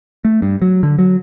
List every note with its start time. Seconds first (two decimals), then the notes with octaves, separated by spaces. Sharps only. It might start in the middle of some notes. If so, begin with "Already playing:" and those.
0.25 A3
0.42 G2
0.62 F#3
0.83 D3
0.99 F#3